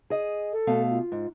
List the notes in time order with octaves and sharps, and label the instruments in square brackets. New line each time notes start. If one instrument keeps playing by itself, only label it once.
[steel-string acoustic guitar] G#4 D#5
[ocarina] A4
[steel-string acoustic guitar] B2 A3 F5
[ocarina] F4
[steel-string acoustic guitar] G#2